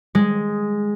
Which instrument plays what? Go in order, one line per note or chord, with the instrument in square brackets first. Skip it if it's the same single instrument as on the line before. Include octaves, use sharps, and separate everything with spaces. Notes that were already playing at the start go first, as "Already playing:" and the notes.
[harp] G#3